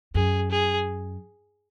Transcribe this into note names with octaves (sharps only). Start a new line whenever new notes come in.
F#2 G#4
G#4